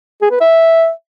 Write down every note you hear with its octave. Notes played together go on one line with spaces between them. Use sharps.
G#4
B4
E5